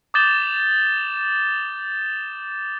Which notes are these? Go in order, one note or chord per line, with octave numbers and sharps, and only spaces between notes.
D6 D#6 G6 A6 E7 G7